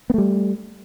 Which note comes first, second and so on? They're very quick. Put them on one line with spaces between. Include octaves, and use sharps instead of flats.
B3 A3 G3